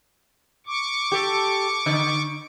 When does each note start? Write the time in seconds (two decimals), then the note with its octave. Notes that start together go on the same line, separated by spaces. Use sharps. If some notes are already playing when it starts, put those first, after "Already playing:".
0.67 C#6 D6
1.12 G4 A4
1.86 D3